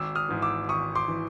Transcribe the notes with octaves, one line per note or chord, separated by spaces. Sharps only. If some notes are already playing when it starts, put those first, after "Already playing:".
Already playing: G#1 D6 E6
D#6 F6
G#2 E3
D6 E6
G#1 C#6 D#6
C6 D6
E3